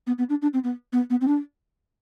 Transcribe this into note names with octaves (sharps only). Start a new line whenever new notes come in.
B3
B3
D4
D4
C4
B3
B3
B3
C4
D4